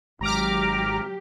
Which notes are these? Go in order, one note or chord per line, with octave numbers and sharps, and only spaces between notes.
G#1 G#2 F#3 G4 A#5 D6 F6